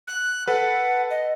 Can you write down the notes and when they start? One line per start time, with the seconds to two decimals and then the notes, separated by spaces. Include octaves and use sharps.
0.07 F#6
0.48 A4 B4 F#5
1.10 D#5